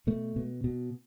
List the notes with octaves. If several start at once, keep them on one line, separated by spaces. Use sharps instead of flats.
B2 A3
B2
B2